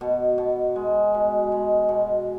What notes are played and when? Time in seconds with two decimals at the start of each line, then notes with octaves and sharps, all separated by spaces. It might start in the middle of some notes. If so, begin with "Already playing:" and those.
0.01 B2
0.38 B2
0.76 G#3
1.14 B2
1.52 G#3
1.89 B2